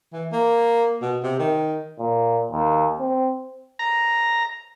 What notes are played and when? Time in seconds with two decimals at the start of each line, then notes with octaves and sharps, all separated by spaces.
0.13 E3
0.32 A#3
1.01 B2
1.23 C3
1.39 D#3
1.99 A#2
2.51 D#2
2.99 C4
3.79 A#5